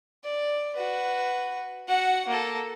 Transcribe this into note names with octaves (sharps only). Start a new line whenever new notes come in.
D5
F#4 B4
F#4 F#5
A#3 A4